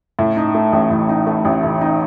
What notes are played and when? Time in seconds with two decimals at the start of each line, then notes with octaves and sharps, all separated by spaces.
0.19 A2
0.37 D#4
0.55 A3
0.72 A1
0.90 A2
1.09 D#4
1.27 A3
1.45 A1
1.63 A2
1.81 D#4